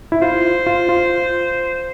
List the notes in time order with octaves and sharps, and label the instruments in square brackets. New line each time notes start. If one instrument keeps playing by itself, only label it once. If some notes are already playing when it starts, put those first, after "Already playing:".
[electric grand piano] E4
[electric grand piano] F4 [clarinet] C5
[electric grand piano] F4
F4